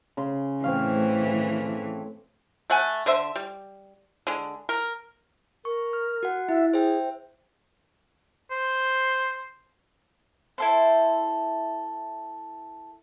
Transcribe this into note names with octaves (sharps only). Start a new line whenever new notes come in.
C#3 C6
A2 E3 C4 C#5 F5
A3
A3 F#5 G#5
D3 C5 E5
G3
D3 G#3
A#4
A#4 C#6
F6
F#4 F#5
E4 E5
G#4 C5 E5 G5
C5
E4 A4 C5